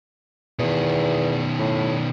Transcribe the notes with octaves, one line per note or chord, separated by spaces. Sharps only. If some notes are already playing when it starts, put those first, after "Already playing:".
E2 B2 D#3
A2